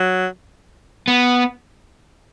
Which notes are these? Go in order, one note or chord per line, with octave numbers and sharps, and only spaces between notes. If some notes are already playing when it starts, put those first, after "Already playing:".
Already playing: F#3
B3